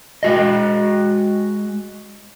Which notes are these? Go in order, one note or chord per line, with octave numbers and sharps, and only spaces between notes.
G#3 F#4 D#5